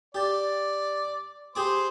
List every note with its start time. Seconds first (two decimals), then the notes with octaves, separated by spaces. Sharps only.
0.15 G4 D5 A5
1.55 G4 G#4 C5 D6